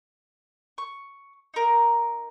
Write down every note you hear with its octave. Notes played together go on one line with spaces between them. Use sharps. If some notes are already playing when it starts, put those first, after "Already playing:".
C#6
D#4 A#4